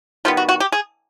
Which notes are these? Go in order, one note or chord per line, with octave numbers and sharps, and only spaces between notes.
D#3 G3 B3 F4
F#4
F#4
G4
G#4